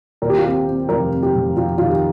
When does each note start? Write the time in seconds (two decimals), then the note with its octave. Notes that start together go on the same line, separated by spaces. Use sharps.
0.22 D#2 A#4
0.30 G4
0.37 F4
0.44 C4 G4
0.67 C4
0.89 F1 A#4
1.11 C4
1.23 G4
1.34 F1
1.56 F1 F4
1.78 D#3 F4
1.89 G4